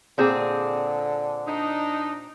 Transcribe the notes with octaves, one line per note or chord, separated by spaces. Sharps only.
A#2 D3 C4 G#4
D4 D#4